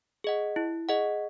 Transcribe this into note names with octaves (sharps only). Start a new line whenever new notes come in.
G#4 D#5 F#5
E4
G#4 D#5 F#5